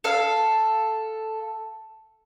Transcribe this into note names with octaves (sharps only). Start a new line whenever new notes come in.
A4 F5